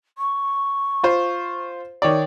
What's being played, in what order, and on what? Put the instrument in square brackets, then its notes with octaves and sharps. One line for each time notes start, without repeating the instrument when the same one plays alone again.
[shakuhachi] C#6
[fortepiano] F4 C5
D#3 C#5 D5